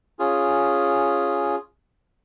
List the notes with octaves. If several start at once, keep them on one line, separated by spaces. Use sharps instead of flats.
C#4 F4 G#4